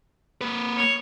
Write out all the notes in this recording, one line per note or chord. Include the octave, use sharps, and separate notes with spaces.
A#3 B4
C#5